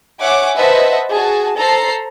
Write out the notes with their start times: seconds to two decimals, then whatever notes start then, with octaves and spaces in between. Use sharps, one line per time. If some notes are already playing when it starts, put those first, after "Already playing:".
0.21 C#5 E5 F#5 G#5 D6
0.57 B4 C5 D#5 E5 F#5 A5
1.15 F#4 G#4 A5
1.58 A4 C5 A#5 C7